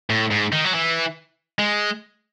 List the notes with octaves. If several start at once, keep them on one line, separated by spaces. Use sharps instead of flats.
A2
G#2
D#3
F#3
E3
G#3